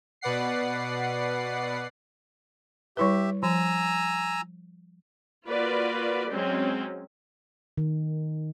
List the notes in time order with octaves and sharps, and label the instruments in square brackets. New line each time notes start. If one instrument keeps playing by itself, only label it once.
[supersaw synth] B2 B4 D5 F#5 C7
[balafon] G3 E4 B4 [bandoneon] G4 E5
[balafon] F3 [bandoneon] G#5 A#5 E6
[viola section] A#3 F4 F#4 B4 D5
F#3 G#3 C4 C#4
[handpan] D#3